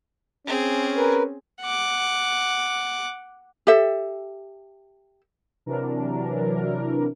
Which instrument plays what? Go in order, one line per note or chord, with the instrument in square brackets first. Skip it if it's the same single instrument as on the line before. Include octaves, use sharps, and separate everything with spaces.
[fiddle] C4 G#4 [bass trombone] C#4
[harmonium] A#4 B4
[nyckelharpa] F#5 D6
[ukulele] G4 A4 E5
[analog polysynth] C3 E3 F#3 D4 A#4